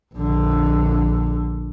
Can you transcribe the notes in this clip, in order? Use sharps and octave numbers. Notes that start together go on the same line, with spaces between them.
A#1 D3